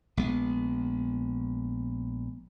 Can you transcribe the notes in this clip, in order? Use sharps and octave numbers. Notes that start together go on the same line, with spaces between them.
A#1 G#3 B3